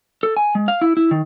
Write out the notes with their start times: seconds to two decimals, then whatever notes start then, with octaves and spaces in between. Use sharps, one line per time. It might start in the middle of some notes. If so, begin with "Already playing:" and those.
0.23 A4
0.37 G#5
0.55 G#3
0.68 F5
0.81 E4
0.97 E4
1.11 D#3